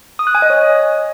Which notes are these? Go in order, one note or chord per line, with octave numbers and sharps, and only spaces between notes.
D#6
F#6
G#5
D#5
C#5